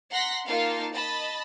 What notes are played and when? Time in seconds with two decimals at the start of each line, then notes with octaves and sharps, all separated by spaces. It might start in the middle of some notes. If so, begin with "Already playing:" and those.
0.11 F#5 A#5 C6 F#6 A#6 B6
0.45 A#3 D#4 F4 F5 A5
0.92 D#5 A5 B5 A6